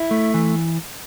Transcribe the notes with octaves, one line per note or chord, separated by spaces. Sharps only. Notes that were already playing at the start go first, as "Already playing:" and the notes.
Already playing: E4
A3
E3